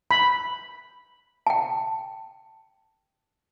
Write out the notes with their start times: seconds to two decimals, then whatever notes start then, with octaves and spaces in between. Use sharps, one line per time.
0.11 B5
1.47 G5 A5